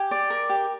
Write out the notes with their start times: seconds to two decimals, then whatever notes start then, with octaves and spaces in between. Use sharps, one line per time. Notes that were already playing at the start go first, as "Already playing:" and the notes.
Already playing: G4 G#5
0.11 D5
0.30 A#4
0.49 G4